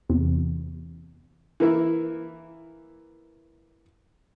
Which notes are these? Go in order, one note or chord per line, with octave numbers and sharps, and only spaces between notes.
E2 C3
E3 A#3 E4